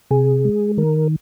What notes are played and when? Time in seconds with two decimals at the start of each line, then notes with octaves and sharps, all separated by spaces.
0.11 C3 G#4
0.45 G#3
0.77 D#3 A#4